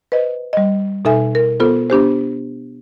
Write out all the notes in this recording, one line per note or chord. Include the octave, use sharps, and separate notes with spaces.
B4 C5 D#5
G3 D#5
B2 D#4 A4 E5 G#5
A#4
B3 F4 A4 C5
B3 D4 G4 C5